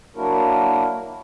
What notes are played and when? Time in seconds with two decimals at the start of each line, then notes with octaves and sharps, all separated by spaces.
0.16 F#3 A#3 D4 E4 F#4 A#4